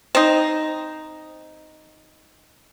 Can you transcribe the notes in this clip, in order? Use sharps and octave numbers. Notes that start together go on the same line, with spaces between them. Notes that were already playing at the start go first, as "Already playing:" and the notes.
C4 D#4